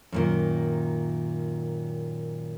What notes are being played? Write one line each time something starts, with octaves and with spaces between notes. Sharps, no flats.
F#2 A#2 D#3